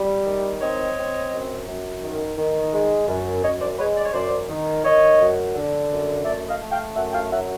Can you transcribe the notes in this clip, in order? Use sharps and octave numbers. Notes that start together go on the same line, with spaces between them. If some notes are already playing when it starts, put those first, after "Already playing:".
Already playing: G3
D#3
C4 C#5 D#5
C4
F#2
F#2
D#3
D#3
G#3
F#2
F#2 C#5 D#5
C5 D5
G#3 B4 C#5
D5
C#5
F#2 C5 D5
D#3
D#3 C#5 D#5
F#2
D3
F#2
A3 D5 E5
D#5 F5
A3
F5 G5
F#2 E5 F#5
F5 G5
F#3 E5 F#5